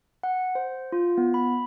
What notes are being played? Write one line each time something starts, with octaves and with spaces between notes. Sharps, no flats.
F#5
C5
F4
B3
B5